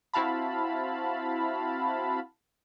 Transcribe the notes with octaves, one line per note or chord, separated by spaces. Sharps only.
C4 E4 F#4 F5 A5 B5